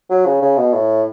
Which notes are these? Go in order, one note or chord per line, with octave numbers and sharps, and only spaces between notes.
F#3
C#3
C#3
B2
A2